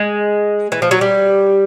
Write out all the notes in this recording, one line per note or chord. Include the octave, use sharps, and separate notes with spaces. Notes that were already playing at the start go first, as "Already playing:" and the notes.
Already playing: G#3
E3
F3
F#3
G3